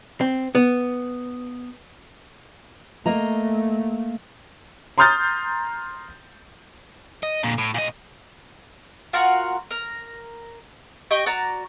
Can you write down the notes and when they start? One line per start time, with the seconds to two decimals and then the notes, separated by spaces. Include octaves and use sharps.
0.21 C4
0.55 B3
3.06 A3 A#3 D#5 A#5
4.98 A#5 C6 D#6 F6 G6 A6
7.23 D#5
7.43 A#2 D3
7.58 A2
7.75 A#2 D#5
9.13 F4 F#4 A#4 F#5
9.71 A#4
11.11 G4 D#5 G5 C#6
11.26 F#4 D5 A#5